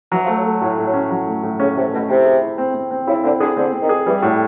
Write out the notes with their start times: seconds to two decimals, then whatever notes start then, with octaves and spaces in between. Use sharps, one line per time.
0.12 E3 F#3
0.24 F3
0.28 A3
0.36 F#3
0.45 A3
0.61 A2 F#3
0.78 A2
0.86 F#3
0.94 C#4
1.11 F#3
1.27 A3
1.43 A2
1.60 C#3 C#4
1.76 C3 A3
1.93 B2 A3
2.09 C3 E4
2.25 G#4
2.42 E4
2.58 C4
2.74 C4
2.91 C4
3.07 C#3 E4
3.23 D3 C4
3.40 D3 G#4
3.57 D3 C4
3.73 C4
3.81 D#3
3.89 G#4
4.06 E3 G3
4.22 A2 F#3